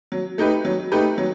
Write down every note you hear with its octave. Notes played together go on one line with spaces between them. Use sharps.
F#3
A3 D#4 G4 B4
F#3
A3 D#4 G4 B4
F#3